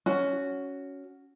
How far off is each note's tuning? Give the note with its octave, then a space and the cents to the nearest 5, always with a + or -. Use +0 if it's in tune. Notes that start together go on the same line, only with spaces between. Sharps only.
C#4 +10 F#4 +0